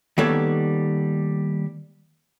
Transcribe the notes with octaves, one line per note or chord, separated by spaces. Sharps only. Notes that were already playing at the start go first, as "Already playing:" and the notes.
D#3 G3 A#3 B3 A4 C#5